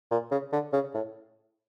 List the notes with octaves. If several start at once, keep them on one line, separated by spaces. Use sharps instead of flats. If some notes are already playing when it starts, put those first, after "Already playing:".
A#2
C#3
D3
C#3
A2